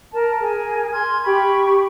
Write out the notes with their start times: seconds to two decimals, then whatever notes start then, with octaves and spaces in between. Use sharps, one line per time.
0.13 A#4 A5
0.41 G#4 A#4 G#5
0.92 C6 F6 G#6
1.24 G4 B5 C#6